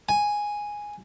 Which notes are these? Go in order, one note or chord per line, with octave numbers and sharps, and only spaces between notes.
G#5